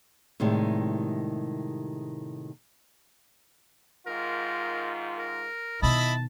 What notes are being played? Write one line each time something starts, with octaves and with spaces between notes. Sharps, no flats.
A2 C3 D#3 G3 G#3
G#2 D#3 F4 A#4
A#4
B2 D#3 E4 D#5 A5 B5